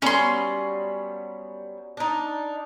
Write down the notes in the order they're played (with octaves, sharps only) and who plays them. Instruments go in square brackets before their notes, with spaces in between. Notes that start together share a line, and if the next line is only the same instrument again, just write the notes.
[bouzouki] F#3 G3 B3 [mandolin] C#4 C6
[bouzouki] D4 D#4